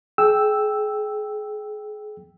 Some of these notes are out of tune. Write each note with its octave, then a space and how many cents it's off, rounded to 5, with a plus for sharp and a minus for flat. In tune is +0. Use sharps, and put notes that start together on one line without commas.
G#4 +30 G5 +0 E6 +0